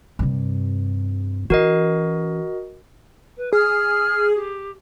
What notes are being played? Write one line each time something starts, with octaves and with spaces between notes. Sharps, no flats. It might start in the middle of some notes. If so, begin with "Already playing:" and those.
G2 C3
E3 C#4 F#4 A#4 D#5
B4
G#4 F6
G4